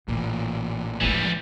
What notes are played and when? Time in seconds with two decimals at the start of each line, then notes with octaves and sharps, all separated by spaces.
0.08 A1 A#2 E3
1.01 E3 F3 G3 G#3